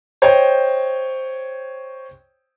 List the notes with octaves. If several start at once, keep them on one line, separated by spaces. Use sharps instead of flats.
C5 C#5 D#5 G5